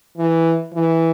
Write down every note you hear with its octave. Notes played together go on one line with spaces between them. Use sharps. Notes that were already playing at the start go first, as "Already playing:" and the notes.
E3
E3